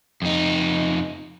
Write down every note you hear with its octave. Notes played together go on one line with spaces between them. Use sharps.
F2 D#4